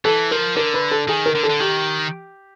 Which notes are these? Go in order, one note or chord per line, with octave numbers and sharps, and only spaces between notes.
E3 A4
F3 A#4
D3 A#4
B4
A4
D#3 G#4
A#4
D3
A4
D3
D#3 G4